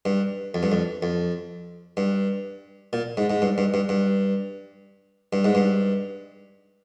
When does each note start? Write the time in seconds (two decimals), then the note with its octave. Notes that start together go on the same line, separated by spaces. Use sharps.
0.05 G2
0.54 F2
0.63 G2
0.72 F2
1.03 F2
1.97 G2
2.93 A#2
3.17 G#2
3.30 G#2
3.42 G2
3.58 G2
3.74 G2
3.89 G2
5.33 G2
5.44 G#2
5.55 G2